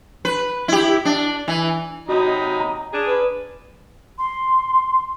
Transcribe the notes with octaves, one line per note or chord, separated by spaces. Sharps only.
B4
E4 G4
D4
E3
C3 F#3 D#4 F#4 D#5 B5
A#5
C#4 D4 G#4
B4
C6